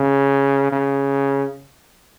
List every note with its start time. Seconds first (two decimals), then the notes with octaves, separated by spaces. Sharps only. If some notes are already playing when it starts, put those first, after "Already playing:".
Already playing: C#3
0.72 C#3